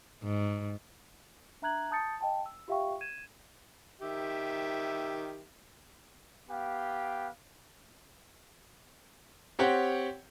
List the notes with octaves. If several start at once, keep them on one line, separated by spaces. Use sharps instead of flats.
G#2
D4 E5 A#5 F#6 G#6 F#7
A5 D#6 G6 A6 C#7
D#5 G5 A5
E6
F4 G4 E5 F5 G5 C#6
G#6 D#7 E7
D#3 G4 E5
B3 G4 F5 G5
C4 G4 C#5 F#5 G5